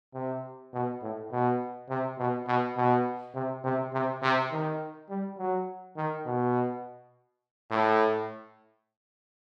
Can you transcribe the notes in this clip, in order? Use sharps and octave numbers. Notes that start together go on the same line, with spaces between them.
C3
B2
A2
B2
C3
B2
B2
B2
C3
C3
C3
C3
D#3
G3
F#3
D#3
B2
A2